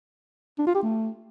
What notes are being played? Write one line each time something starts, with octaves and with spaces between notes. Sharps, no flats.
D4
F4
G4
A3